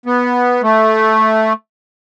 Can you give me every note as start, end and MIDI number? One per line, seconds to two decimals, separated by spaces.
0.06 0.62 59
0.63 1.53 57